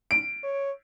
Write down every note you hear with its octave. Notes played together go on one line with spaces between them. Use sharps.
D7
C#5